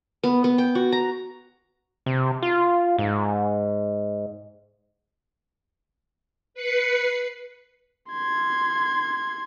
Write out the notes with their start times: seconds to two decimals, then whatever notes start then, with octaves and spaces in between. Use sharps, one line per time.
0.23 B3
0.44 B3
0.58 G5
0.75 F#4
0.92 A#5
2.06 C3
2.43 F4
2.98 G#2
6.54 B4 C7 C#7
8.09 C6 G#6